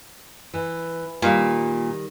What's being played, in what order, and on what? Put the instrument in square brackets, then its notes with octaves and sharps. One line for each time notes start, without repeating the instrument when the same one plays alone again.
[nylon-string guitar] E3
[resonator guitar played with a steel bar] A#2 [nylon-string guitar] D#3 G3